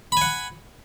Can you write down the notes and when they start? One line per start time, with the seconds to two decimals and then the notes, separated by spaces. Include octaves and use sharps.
0.12 B5
0.17 G#5
0.21 F#5